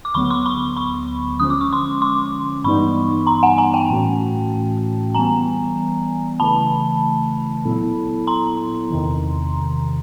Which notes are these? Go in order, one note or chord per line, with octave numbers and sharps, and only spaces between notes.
D6
D2 D3 F#3 B3 B5 C#6
C6 D6
B5 C#6
B5 C#6
D3 F3 G#3 C#4 D#6
D6
C#6
C6 D6
C6 D6
G2 E3 G3 B3 D#4 B5 C#6
A#5 C6
F#5 G#5
G#5 A#5
G5 A5
A2 E3 A3 C#4 F#4
E3 G3 B3 G#5 A#5
C#3 E3 A3 A5 B5
A#2 F#3 B3 E4 A4
A#5 C6
E2 C3 D#3